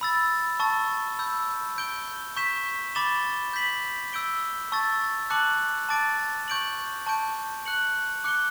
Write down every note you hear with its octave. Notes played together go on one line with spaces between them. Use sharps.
B5 E6 A6
A5 C#6 E6 A6
B5 E6 G6
G6 D7 G7
C#6 G6 B6 E7
B5 D6 A6 E7 G7
G6 B6 F#7
E6 G6 D7 G7
A5 C#6 E6 A6
A5 D6 F#6 C#7 F#7
A5 D6 A6 D7
C#6 G6 D7 F#7
A5 C#6 G6 D7
F#6 C#7 F#7
D6 F#6 C#7 G7